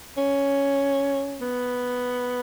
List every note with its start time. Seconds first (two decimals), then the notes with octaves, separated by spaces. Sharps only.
0.16 C#4
1.41 B3